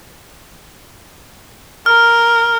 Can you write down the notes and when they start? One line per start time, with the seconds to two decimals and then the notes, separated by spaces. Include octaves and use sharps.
1.86 A#4 F6